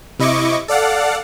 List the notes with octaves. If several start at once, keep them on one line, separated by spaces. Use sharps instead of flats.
C3 E4 D#5 C#6 D6
A4 D5 F5 F#5